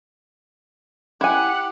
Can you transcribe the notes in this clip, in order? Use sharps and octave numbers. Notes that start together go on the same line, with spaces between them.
E4 G4 F#5 G#5